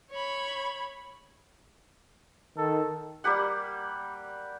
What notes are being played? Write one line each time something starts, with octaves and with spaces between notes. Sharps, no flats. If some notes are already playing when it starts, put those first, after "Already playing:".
C#5 B5
D#3 A4
G3 A#3 G4 F#5